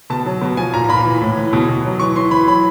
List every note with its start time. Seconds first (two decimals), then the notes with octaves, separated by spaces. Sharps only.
0.10 B2 A5
0.26 F#3
0.42 B2
0.57 F3 G#5
0.73 A#2 A#5
0.84 A#5
0.89 A#2 B5
1.05 E3
1.21 A2
1.37 E3
1.53 B2
1.68 B2
1.85 F#3
1.99 E3 C#6
2.15 E3 C6
2.31 E3 B5
2.47 F#3 B5